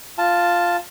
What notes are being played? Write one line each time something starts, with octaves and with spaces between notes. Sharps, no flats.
F4 A5